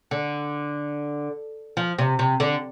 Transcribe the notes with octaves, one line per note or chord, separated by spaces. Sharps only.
D3
F3
C3
C3
D3